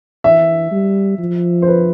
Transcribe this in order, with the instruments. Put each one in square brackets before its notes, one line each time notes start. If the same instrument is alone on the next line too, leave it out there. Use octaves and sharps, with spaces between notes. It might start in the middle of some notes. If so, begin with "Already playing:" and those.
[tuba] E3 [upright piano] E5
[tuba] G3
F3
[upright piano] C5
B4